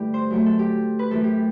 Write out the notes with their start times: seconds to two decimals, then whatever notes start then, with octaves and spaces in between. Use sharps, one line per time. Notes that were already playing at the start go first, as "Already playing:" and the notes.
Already playing: G2 D3 A3 E4 G4
0.14 C5
0.30 F#2 F#3 A3
0.46 A4
0.59 G4
0.99 B4
1.10 F#2 E3 A3 A4
1.24 G4